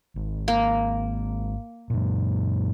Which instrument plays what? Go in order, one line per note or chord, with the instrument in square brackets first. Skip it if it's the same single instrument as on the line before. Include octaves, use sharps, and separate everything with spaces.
[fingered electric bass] G#1
[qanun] A#3
[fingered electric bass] F#2 A#2